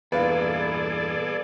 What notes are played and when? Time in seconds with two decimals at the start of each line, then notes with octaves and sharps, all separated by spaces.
0.12 E2 G2 A#2 G#4 A4 B4 D5 F5